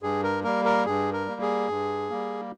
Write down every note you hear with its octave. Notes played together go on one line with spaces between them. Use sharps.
G2 G#4
A#4
G3 A#3 A#4
A#4
G2 G#4
A#4
G3 A#3
G#4
G2
G3 A#3